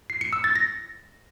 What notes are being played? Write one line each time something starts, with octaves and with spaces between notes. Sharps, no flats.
C7
C#7
E6
A6
A#6